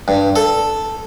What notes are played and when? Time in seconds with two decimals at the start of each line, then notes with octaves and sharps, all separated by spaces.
0.08 G2
0.36 A4